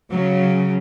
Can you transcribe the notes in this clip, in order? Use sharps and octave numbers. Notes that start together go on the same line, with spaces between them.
C#3 F#3